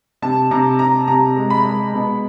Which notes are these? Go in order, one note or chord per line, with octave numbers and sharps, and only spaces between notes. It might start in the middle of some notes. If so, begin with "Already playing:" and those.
C3 A5
C3 A#5
C3 A#5
C3 A#5
G#3
B5
G#3
B2